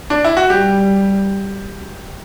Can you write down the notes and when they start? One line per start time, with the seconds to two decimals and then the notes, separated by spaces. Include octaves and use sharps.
0.10 D4
0.25 E4
0.37 F#4
0.50 G3 G4